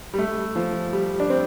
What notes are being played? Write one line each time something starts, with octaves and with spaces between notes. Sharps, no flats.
G3
A3
F3
G3
D4
C4